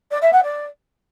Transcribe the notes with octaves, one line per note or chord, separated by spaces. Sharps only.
D5
E5
F#5
D5